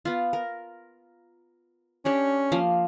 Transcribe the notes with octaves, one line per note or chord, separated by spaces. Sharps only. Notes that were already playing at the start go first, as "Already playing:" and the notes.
B3 F4
A#4
C#4 D4 G4 C#5
F3 A#3 F5